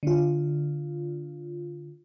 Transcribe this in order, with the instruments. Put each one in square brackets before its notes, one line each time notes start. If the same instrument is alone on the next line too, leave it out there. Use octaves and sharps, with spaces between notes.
[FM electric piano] D3 F4